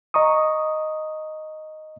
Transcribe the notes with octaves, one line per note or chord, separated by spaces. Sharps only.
D#5 A#5 C#6 D#6